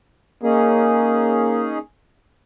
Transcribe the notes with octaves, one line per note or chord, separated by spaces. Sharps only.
A#3 C#4 D#4 G#4